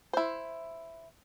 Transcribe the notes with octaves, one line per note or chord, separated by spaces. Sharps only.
E4 C5